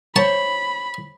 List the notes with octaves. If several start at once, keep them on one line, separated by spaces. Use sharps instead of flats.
C5 C#5 A5 B5